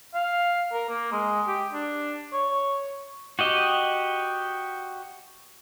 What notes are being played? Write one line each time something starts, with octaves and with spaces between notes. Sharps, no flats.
F5
A#4
A#3
G#3
G4
D4
C#5
F#4 G4 D#5